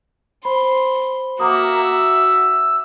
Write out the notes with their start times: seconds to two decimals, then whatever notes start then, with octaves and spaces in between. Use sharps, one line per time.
0.45 C5 B5 C6
1.40 A#3 F#4 E5 D6 D#6
1.82 E6